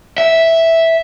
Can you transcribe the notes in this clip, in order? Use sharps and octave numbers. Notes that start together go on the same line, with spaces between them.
E5